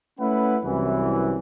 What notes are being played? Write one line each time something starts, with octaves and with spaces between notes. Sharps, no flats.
A3 C#4 E4 B4 F#5
C2 F#2 E3